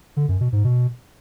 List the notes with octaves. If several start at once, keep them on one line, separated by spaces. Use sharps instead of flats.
D3
F#2
B2
G#2
B2